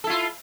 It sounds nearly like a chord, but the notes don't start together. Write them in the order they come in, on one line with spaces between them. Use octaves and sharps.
A4 E4 F4